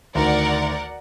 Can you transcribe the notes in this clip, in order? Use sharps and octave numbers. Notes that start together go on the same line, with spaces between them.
D2 D#3 A#4 D5 F#5